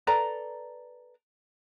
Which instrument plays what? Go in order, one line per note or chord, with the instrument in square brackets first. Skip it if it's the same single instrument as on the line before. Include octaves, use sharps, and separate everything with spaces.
[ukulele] A4 B4 D5 A#5